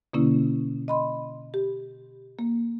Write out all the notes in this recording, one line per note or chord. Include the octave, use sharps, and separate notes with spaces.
B2 D3 A#3 C#4 E4
D#5 B5 C6
G4
A#3